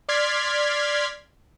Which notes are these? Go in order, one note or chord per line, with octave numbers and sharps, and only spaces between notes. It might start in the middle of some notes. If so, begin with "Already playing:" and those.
D5 C6 F6 G#6 B6